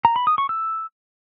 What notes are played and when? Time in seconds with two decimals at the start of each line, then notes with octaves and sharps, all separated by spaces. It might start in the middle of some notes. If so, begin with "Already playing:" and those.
0.05 A#5
0.16 B5
0.27 D#6
0.38 C#6
0.49 E6